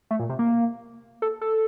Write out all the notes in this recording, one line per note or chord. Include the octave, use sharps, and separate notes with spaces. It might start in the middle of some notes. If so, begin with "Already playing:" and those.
A3
A#2
C3
A#3
A4
A4